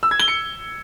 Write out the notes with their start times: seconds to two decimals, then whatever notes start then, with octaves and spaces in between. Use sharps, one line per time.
0.03 E6
0.11 G#6
0.20 G7
0.28 C#7